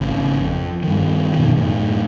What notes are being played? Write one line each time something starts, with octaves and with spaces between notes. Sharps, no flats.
G#1 C#3
F2
G2 D#3
F2 B2 D#3
F#2 A2